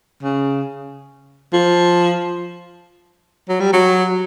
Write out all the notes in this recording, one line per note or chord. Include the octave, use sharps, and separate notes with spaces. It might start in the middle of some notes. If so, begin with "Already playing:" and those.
C#3
F3
F#3
G3
F#3